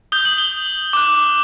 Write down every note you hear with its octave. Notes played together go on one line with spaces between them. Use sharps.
D#6 G6 G7
F#7
G7
D6 F#6